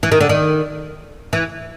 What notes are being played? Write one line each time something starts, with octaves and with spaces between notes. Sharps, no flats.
E3
D#3
D3
D#3
E3